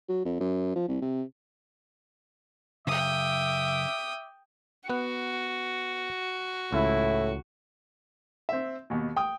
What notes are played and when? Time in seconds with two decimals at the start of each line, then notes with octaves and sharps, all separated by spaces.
0.09 F#3
0.25 F2
0.40 F#2
0.75 F3
0.88 C2
1.02 C3
2.87 F#2 C#3 E5 G5 D6 D#6
4.90 B3 F#4 F#5
6.73 C#2 A2 E4
8.49 C4 E5
8.90 D#2 B2
9.16 G5 D#6